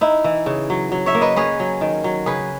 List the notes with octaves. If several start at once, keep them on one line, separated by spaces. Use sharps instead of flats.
D#4 E4
E3
C#3
F#3
F#3
C#5 E5
A#3
B4 D#5
C#4 G#4 B4
F#3
D#3
F#3
C#3 G#4 B4